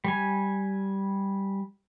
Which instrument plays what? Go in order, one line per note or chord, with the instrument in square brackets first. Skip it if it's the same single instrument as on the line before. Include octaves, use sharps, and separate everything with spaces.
[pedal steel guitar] G3 G#5